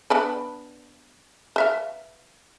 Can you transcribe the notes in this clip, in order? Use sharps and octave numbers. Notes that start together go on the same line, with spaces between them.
B3 D4 B4
B4 E5 F5